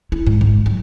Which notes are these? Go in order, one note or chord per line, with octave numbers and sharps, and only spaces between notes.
E4
G#2
G#1
F#3